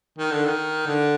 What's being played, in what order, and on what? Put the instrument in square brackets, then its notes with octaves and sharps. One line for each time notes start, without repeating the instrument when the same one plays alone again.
[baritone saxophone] D#3
D3
D#3
D3